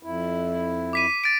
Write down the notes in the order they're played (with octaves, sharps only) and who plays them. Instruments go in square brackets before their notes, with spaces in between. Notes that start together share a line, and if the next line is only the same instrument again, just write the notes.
[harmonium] F2 E4
[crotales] D6 B6 D#7
A6 D7